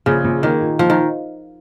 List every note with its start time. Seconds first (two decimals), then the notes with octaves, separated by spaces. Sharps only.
0.06 A#1 C#3
0.24 A#1
0.43 D#3 A#3
0.61 A#2
0.79 A#2 F3
0.90 D#3